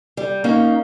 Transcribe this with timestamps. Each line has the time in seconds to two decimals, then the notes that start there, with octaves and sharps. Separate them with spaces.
0.17 G3
0.44 A#3 C#4 D#4